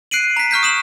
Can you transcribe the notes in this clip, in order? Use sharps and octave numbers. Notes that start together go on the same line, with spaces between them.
F#6 C7 D7 D#7 F#7
A#5 B6
C#6 F6 G6 B6
D#6 B6 E7 F#7